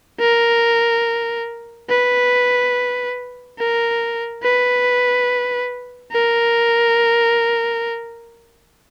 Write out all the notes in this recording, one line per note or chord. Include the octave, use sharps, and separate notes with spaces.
A#4
B4
A#4
B4
A#4